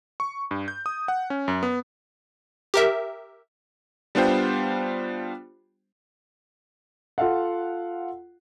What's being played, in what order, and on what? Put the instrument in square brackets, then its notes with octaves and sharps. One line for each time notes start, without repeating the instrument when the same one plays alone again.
[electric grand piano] C#6
G2
G6
D#6
F#5
C#4
F#2
B3
[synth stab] G4 A#4 E5
[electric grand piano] G3 B3 D4 F4 C5 G5
[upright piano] F4 A4 F5 F#5